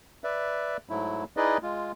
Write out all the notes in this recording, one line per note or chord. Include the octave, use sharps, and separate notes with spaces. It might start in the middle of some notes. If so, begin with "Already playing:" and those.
B4 D5 E5
G#2 F#3 A3 E4
D#4 E4 G#4 B4 D5 D#5
G#3 F4